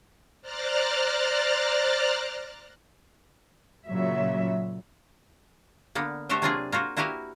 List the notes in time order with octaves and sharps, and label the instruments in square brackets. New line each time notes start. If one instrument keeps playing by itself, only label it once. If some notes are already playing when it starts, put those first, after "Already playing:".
[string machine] C5 D5 A#5 F6 F#6 A6
[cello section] A#2 C#3 F#3 E5
[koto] D3 A#3 B3
A3 F#4 G4 C5 E5 G5
C3 F#3 A#3 D4 F4 G#4
A#3 F4 F#4
A#3 E4 F#4 G4 A#4 B4